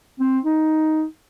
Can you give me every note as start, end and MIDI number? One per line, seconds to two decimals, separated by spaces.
0.20 0.39 60
0.45 1.04 63